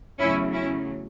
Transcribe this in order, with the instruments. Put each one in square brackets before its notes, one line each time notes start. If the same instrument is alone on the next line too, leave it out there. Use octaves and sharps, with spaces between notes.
[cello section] E2 C#3 F#3 A3 C#4 E4
C#4 E4